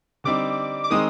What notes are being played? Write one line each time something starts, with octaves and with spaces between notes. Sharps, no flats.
D3 G3 C4 D#4 D6
D6
D#3 G#3 C4 D#4 D#6